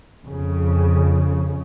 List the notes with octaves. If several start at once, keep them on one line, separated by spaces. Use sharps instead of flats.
F2 C#3